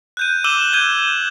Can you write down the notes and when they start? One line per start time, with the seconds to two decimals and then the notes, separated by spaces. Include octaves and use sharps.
0.17 F#6 G6 D#7
0.44 D6 E6 D#7 E7 F#7 G7
0.73 G6 G#6 D#7 G7